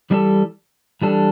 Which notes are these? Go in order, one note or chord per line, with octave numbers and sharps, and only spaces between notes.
E3 G3 D4 A4
E3 G3 D4 A4